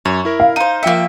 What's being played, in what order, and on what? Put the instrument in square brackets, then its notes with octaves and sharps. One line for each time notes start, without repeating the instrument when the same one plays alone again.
[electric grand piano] F#2 [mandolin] C#5
[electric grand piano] E4 A#4
[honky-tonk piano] F5
[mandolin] D#4 C5 [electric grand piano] D#7
[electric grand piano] F3 G5 C#7 [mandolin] A#3 E5